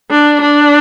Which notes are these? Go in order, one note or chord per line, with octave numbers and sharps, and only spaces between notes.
D4
D4